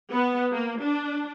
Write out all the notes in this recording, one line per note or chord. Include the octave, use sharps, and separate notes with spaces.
B3
A#3
D4